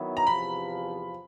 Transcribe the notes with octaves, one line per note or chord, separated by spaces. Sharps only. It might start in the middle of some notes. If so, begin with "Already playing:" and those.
Already playing: D#3 F#3 B3 E4
A#5
E2 C3 F3 B5